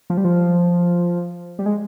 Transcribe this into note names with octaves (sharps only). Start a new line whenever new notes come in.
F3
G3
F3
G3
G#3